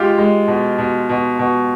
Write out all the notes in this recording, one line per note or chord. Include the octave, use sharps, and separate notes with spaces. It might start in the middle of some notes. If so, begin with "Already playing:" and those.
Already playing: G#3 F4 G4
G#3
B2
B2
B2
B2